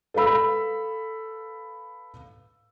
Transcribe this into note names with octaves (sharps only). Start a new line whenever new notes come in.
A4 B4 F5 B5 E6